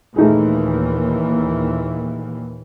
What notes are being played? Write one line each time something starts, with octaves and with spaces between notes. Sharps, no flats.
D#2 A#2 E3 A3 D#4 G#4